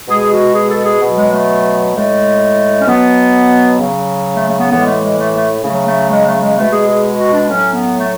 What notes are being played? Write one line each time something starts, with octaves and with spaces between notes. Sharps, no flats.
B2 G#3 G#4
F#4
G#4
A4
G#4
B2 F#3
G#3
A3
A2 G#3 A3
C#4
B2 F#3 B3
C#3 F#3
A3
A3
B3
A2 E3 G#3 B3
A3
G#3
A3
A3
C#3 F#3 A3
A3
G#3
A3
G#3
B2 G#3 A3
G#4
G#4
F#4
D4
A2 F#3 C#4
B3
A3